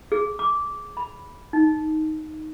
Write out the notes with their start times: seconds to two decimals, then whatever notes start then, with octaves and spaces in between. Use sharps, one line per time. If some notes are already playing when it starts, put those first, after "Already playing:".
0.12 G#4
0.39 D6
0.97 B5
1.53 D#4